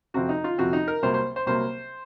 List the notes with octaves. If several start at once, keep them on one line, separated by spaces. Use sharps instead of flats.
F2 C3 F3 C4 F#4
D#4
F4
F2 C3 F3 C4 F#4
D#4
A#4
C2 C3 F#3 A#3 C5
C5
C5
C2 C3 F#3 A#3 C5